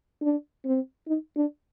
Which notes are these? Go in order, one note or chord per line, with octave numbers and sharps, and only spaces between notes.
D4
C4
D#4
D4